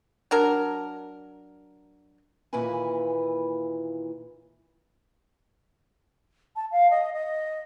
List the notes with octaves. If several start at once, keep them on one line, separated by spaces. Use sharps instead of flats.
F#3 D4 A#4
D#2 A#2 E3 E4 B4 G#5
A5
F5
D#5
D#5